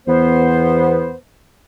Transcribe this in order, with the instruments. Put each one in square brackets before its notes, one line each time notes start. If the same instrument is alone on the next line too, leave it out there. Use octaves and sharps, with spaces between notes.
[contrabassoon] E2 [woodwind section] B3 C5